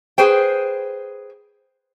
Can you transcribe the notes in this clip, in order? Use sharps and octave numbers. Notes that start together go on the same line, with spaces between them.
G#4 B4 C5 G5